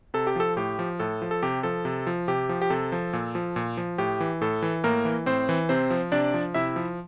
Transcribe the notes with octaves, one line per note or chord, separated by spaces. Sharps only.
C3 A4
G4
F3 A4
A2 G4
F3
A2 A4
F3
A4
C3 G4
F3 A4
C3
F3
C3 G4
F3
G4
C3 A4
F3
A#2
F3
A#2
F3
A2 G4
E3
A2 A4
E3
A2 A#3 A#4
E3
A2 C4 C5
E3
C3 C4 C5
F3
C3 D4 D5
F3
C3 E4 E5
F3